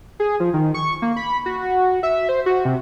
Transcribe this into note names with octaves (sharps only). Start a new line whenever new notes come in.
G#4
F3
D#3
C#6
A#3
B5
F#4
E5
C5
F#4
C3